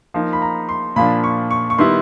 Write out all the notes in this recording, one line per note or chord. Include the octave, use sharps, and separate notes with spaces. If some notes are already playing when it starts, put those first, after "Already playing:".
F3 A#3 D#4
B5
A#5
C6
A#2 F3 A#3 D4 B5
C#6
C#6
C#6
D#3 G3 B3 E4 C6